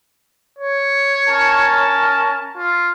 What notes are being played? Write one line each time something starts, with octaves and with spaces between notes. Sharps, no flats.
C#5
C#4 A#4 A5
F4